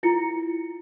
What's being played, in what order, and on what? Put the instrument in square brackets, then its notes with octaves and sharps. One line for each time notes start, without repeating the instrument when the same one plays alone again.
[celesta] E4 F4 A#5 C#7